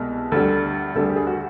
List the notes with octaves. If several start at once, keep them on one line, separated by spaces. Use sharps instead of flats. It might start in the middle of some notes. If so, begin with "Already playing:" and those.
Already playing: C2 B2 G#3
D2 D3 G3 A4
D2 D3 G3 A4
G#4
G4
G#4
F#4